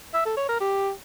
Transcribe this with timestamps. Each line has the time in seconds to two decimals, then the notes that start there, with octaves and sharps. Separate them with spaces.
0.14 E5
0.26 A4
0.37 C#5
0.49 A#4
0.60 G4